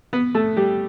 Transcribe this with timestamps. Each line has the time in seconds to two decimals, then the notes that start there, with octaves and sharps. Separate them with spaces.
0.13 B3 B4
0.35 A3 A4
0.57 G3 G4